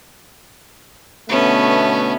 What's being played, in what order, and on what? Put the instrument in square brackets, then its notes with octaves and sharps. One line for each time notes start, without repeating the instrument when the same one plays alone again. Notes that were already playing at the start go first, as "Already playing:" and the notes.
[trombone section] B2 D3 A3 [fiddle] B3 C#4